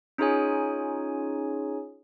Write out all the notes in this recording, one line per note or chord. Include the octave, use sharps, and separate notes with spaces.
C#4 D#4 F4 G#4 C#5 G#5